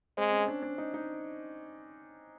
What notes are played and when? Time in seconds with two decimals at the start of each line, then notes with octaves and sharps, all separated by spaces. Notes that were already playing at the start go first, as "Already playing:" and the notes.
0.17 G#3 C4
0.32 C#4
0.48 D4
0.63 D4
0.78 D#4
0.94 D#4